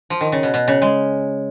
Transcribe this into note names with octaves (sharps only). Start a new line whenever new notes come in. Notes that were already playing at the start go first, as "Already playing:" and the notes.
F3
D#3
C#3
B2
B2
C#3
G#3